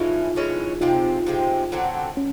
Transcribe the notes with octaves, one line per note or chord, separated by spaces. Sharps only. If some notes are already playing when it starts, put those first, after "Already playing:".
Already playing: A2 E3 G#3 C#4 D#4 F4
A2 E3 G#3 C#4
C3 F3 G#3 C4 D#4 F4
C3 F3 G#3 C4
D3 F#3 A3 C4
C#4